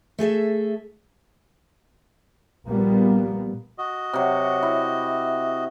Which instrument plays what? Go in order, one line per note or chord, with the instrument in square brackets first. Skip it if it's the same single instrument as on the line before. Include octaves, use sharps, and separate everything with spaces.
[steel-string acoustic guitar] A3 G#4 A4 E5
[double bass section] A#1 G3 A#3 B3
[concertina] F#4 D#5
[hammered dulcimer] C3 F#3
E4